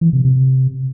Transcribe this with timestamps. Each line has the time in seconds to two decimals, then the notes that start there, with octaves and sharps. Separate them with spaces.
0.01 E3
0.13 C3
0.25 C3